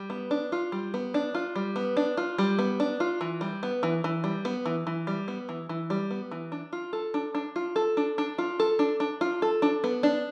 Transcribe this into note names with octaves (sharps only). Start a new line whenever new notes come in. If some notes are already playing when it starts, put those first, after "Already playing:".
Already playing: G3
B3
D4
F4
G3
B3
D4
F4
G3
B3
D4
F4
G3
B3
D4
F4
E3
G3
B3
E3
E3
G3
B3
E3
E3
G3
B3
E3
E3
G3
B3
E3
D4
F4
A4
D4
D4
F4
A4
D4
D4
F4
A4
D4
D4
F4
A4
D4
B3
D4